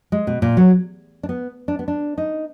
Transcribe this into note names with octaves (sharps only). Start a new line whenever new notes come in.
G#3
B2
A#2
F#3
D4
B3
D4
B3
D4
D#4